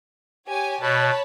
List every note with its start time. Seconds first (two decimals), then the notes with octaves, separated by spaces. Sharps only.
0.48 G4 C#5 G#5
0.80 B2 C#5 A5 B5